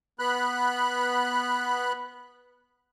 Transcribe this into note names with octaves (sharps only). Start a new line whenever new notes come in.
B3 B5 F#6